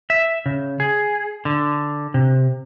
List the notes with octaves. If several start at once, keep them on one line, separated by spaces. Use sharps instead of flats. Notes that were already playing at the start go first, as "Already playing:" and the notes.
E5
C#3
G#4
D3
C3